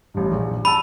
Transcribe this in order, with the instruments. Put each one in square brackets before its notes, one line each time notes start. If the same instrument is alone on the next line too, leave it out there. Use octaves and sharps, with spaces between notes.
[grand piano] A1 G2
A#1
[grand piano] A5 E6 D#7 [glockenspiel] B5